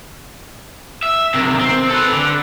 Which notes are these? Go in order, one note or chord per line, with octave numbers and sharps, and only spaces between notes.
E5
C3 D#3
C4
A4 B4
D3